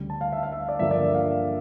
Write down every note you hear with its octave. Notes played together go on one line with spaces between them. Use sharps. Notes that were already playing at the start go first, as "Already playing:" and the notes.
Already playing: D2 C#3 G3
A5
F5
E5
F5
E5
D5
G2 D3 F3 A#3 E5
D5
E5
F5